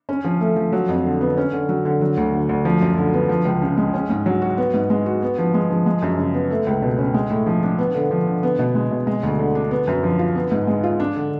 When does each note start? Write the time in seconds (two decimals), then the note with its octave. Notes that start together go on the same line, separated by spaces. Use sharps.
0.09 C#4
0.25 F3
0.41 A3
0.56 F3
0.72 F#3
0.89 F2
1.05 D3
1.21 B3
1.37 C#4
1.53 D3
1.69 F#3
1.85 D3
2.01 F#3
2.17 D2
2.34 D3
2.49 D2
2.65 F3
2.81 F#2
2.98 D3
3.13 B3
3.29 F3
3.45 C#2
3.62 C#3
3.77 G#3
3.94 C#4
4.10 G#2
4.26 F#3
4.42 F#4
4.58 B3
4.74 G#2
4.90 G#3
5.06 F#4
5.22 B3
5.38 F3
5.54 G#3
5.70 F3
5.86 G#3
6.02 F#2
6.18 C#3
6.34 B3
6.51 A3
6.67 C#2
6.82 B2
6.99 C#4
7.14 G#3
7.30 A2
7.46 F3
7.63 D4
7.79 B3
7.95 D3
8.11 F3
8.27 D3
8.43 B3
8.59 B2
8.75 G#3
8.91 B2
9.07 G#3
9.23 D2
9.39 D3
9.55 D4
9.71 B3
9.87 F#2
10.03 F3
10.19 F4
10.35 B3
10.51 G#2
10.67 G#3
10.83 F4
11.00 D4
11.16 D3